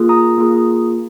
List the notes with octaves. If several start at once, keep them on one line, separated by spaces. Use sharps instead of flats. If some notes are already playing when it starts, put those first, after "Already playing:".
Already playing: A#3 F4 G#4
A#5 D#6
A#3 F4 G#4